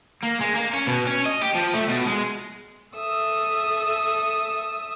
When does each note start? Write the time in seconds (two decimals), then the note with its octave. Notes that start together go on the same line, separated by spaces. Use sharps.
0.23 A#3
0.41 G#3
0.56 A#3
0.74 C#4
0.87 B2
1.07 C#4
1.25 D#5
1.41 G4
1.55 F3
1.73 A3
1.88 B2
2.06 G#3
2.96 A4 E5 D#6 E6